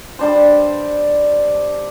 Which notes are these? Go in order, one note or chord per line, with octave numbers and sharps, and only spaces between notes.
G3 D4 C5